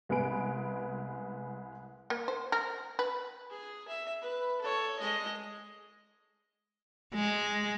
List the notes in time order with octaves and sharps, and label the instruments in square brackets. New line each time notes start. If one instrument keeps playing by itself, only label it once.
[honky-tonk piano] C2 G#3 B3 G#4 B4 D7
[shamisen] A#3
C5
A#4
B4
[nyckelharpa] G#4
E5
B4
A4 C#5
G#3 D#5
[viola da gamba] G#3